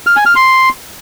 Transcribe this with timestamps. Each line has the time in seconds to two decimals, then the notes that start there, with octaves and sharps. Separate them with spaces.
0.07 F6
0.16 G#5
0.26 F6
0.36 C6